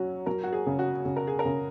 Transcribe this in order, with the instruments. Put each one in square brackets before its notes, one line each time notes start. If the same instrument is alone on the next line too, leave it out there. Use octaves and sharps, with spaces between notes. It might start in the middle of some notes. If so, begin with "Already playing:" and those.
Already playing: [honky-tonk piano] F#3 [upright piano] C#4 F#4
[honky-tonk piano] F#3 [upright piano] A#4
[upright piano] F#4
G#4
[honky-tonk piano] C#3
[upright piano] F#4
[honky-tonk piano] C#3
[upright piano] A#4
G#4
A#4
[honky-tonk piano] C#3